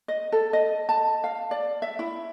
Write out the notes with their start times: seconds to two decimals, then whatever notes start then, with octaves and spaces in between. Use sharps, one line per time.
0.08 D#5
0.32 A4
0.53 D#5
0.89 A5
1.24 F5
1.51 D5
1.82 E5
1.99 E4